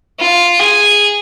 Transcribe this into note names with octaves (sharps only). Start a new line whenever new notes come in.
F4
G#4